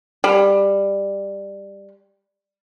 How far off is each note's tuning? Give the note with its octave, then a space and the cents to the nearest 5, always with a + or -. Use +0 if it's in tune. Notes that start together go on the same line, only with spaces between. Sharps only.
G3 +15